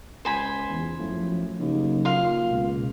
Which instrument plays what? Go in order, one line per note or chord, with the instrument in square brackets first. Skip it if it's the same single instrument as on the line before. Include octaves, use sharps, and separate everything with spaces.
[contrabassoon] C#2 [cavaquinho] C5 G#5 B5
[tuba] E2
[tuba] F#2 [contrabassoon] A2 [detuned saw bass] F3
[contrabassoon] D#2 [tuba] C#3 [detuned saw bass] F#3
[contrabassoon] A#2 [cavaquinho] F5 C6
[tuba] C#2 [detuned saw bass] B2